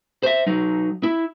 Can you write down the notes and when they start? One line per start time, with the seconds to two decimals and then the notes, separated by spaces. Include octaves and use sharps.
0.23 C5 E5
0.46 F#3 D#4
1.03 E4